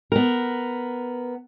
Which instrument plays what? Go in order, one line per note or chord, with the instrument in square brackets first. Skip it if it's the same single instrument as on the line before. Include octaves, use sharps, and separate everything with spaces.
[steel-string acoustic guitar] B3 A#4